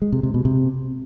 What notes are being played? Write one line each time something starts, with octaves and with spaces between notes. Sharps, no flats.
G#3
C3
C3
B2
C3